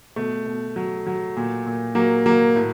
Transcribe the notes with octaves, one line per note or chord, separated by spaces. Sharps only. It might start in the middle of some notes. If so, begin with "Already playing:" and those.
B2 A3
B2
F#3
F#3
A#2
A#2
F#3 A#3
F#3 A#3
A2